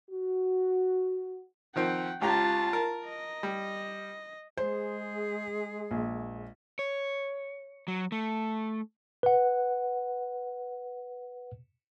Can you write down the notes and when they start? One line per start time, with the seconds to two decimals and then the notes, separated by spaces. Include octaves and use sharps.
0.11 F#4
1.76 D#3 F3 C4 F#5 G5
2.21 C#2 F4 G4 A5 A#5
2.73 A#4
3.06 D#5
3.43 G3
4.57 G#3 G#4 C5
5.91 A#1
6.79 C#5
7.88 F#3
8.12 A3
9.23 B4 F#5